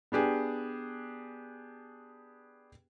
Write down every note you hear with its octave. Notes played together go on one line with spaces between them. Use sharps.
B3 D4 G4 G#4